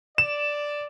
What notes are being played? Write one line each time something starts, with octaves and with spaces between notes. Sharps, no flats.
D5 E7